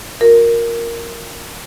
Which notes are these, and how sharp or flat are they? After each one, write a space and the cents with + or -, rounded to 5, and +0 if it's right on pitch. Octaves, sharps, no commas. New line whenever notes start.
F4 +45 A#4 +0